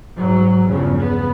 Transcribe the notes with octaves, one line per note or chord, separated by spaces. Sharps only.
G#2 F#3
E2 G2 C#3 F3
B3